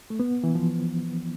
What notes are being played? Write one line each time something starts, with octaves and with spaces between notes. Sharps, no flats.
A3
B3
E3
F3